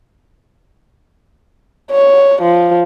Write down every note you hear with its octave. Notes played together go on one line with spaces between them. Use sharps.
C#5
F3